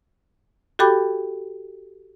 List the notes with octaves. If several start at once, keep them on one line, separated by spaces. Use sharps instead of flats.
F#4 G4 A4 G5 B5 D6